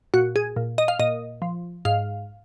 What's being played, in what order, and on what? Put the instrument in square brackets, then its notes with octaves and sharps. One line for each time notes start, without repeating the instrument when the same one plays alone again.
[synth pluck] A#2 F#4
G#4
A#2
D#5
F5
A#2 D#5
F3
G#2 F5